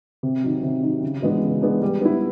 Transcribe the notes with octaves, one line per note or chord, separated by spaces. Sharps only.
C3
D#3 F#3
C3
D#3 F#3
C#3
E3 G#3 B3 D4
C#3
E3 G#3 B3 D4
G3
B3 E4